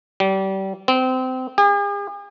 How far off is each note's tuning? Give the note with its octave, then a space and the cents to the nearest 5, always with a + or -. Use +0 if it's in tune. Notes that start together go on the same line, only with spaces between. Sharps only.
G3 -30
C4 -25
G#4 -45